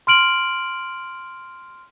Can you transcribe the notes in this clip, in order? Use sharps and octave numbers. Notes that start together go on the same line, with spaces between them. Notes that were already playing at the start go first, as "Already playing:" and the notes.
C6 F6 D7 F#7